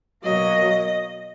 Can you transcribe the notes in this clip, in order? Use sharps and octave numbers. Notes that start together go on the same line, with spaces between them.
B2 F#3 A#3 D#5